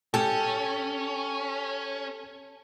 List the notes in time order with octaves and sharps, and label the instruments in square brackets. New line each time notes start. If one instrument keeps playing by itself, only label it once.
[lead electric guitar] C#4 [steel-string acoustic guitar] G4 G5 [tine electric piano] A4 A5